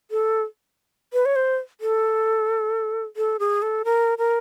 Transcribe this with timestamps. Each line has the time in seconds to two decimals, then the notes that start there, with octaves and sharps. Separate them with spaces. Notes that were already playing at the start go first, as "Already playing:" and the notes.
0.11 A4
1.13 B4
1.26 C#5
1.36 C5
1.81 A4
3.17 A4
3.40 G#4
3.62 A4
3.85 A#4
4.18 A#4